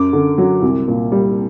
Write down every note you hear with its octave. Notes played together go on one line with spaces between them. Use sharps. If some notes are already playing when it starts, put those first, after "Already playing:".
Already playing: F#2 D6
D3
F#3
C2
A#2
G3